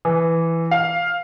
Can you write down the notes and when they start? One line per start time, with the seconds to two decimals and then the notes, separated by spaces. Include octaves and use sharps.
0.05 E3
0.71 F5